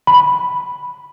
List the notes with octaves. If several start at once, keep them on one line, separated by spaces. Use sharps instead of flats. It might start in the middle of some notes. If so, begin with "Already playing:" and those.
B5